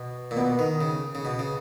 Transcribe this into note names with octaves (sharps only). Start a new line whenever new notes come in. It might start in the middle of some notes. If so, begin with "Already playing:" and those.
Already playing: B2
A#2
B2 B3
D#3
C#3
C#3
B2
C#3